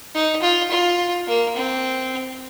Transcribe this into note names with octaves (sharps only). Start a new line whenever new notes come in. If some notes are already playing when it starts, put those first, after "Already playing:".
D#4
F4
F4
A#3
C4